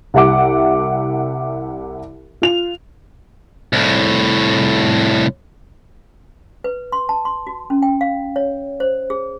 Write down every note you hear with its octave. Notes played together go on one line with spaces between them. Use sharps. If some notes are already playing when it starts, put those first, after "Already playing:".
C2 G4 E5 F#5 D6
F4 F7
C2 A2
B4
C6
A5
C6
F#4
C#4
G5
F5
C#5
C5
G#4